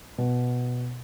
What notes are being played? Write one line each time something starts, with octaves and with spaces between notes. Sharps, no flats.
B2